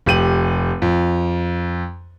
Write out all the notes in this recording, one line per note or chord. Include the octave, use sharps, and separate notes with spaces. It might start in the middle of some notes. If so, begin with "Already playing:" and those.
F1 G4 D#7 F#7
F2